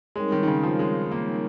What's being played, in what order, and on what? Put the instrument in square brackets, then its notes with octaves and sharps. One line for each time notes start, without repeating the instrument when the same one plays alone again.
[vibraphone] G3 C4 D#4 A#4 C#5 [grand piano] G#3
[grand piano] D#3
D#3
C#3
F3
G#3
A#3